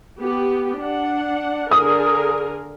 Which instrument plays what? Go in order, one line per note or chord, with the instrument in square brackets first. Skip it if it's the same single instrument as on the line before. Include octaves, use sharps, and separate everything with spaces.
[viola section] B3 G4
D4 F#5
[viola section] D3 G#4 A#4 [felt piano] D#6